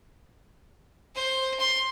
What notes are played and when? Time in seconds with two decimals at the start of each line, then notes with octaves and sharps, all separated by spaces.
1.15 C5
1.60 C6